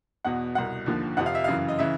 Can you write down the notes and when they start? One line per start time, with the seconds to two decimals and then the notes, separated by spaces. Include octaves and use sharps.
0.25 E2 B2 F#5
0.55 C2 B2 F#5
0.86 D#2 D3 F3
1.17 F2 C3 F3 F#5
1.26 F5
1.35 E5
1.44 F#2 C#3 E3 F5
1.68 D#5
1.79 C#3 E3 E5